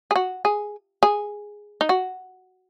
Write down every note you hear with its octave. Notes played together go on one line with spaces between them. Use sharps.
G#4
F#4
G#4
G#4
D#4
F#4